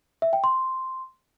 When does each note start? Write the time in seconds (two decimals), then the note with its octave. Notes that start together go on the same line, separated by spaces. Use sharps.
0.22 E5
0.33 G5
0.44 C6